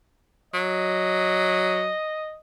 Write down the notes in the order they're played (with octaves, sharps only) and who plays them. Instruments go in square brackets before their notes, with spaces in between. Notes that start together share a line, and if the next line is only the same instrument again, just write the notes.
[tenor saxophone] F#3 [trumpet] D#5